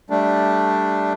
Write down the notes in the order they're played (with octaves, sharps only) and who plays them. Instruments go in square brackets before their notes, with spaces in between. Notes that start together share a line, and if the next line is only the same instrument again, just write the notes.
[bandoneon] G3 A3 D4